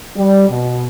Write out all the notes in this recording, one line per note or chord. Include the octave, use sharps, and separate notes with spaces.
G3
B2